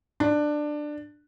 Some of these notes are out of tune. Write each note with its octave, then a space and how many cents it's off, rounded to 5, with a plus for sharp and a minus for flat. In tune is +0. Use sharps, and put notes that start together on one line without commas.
D4 +15